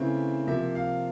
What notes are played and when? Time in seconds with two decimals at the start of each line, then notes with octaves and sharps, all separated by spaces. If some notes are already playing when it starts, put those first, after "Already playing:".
Already playing: C#3 E3 A3 C4 E5
0.47 C3 F3 A#3 E5
0.75 F5